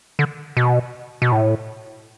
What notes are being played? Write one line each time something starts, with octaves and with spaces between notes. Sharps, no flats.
D3
B2
B2
A2